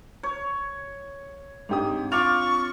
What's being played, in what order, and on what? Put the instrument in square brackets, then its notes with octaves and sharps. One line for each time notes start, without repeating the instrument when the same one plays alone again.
[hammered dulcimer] C#5
[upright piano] G#2 G4 D#6 [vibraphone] C4 D4
[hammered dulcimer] F4 D6 [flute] C#6 [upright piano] F7